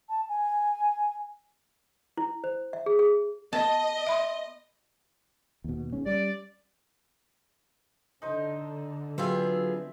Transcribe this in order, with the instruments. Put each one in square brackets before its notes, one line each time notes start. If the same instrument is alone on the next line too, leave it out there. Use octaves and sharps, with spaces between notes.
[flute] A5
G#5
[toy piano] E4
C5
E5
G#4
G#4
[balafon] B3 [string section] D#5 [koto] A5
[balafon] E5 B5 C6
[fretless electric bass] D#2 B2
G#1 G#2 C#4
[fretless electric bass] G3 C#4 [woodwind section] D5
[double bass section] D3 [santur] D#4 C5 D#5
[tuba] F#3 [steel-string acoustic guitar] B3 F4 G#4 [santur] C4 E5